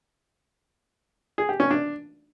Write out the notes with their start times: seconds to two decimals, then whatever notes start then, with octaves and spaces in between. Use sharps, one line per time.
1.38 G#4
1.49 G4
1.60 C#4
1.70 D4